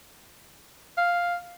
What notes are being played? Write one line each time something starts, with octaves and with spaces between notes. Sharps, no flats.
F5